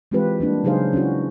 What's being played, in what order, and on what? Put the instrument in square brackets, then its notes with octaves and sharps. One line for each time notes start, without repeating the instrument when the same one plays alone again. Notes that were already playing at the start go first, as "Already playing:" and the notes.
[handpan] E3 G#3 C4 F4 G4 B4
G3 A#3 D4
C#3 F#3 D#4 G#4 C5 F5
C#4 D4 E4 F#4